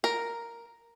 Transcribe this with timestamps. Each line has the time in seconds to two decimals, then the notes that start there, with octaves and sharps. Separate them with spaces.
0.04 A#4